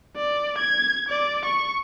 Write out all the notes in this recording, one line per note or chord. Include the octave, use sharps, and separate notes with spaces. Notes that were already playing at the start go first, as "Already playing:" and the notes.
D5
G#6
D5
C#6